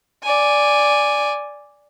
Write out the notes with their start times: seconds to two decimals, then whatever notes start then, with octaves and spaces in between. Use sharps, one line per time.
0.23 D5 G#5